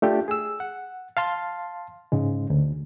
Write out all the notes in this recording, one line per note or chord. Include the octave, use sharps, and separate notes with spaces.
A3 D4 F4 G4
G#4 E6
F#5
F5 A5 C6
G#2 C#3 G#3
D2